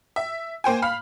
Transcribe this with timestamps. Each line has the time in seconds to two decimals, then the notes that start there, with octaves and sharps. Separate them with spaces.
0.16 E5
0.64 A#3 C5 G5 G#5
0.82 F5 B5 F6